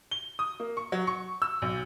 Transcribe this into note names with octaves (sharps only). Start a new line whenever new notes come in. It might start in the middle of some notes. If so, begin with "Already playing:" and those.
G7
D#6
A#3
C#6
F#3
C#6
E6
B1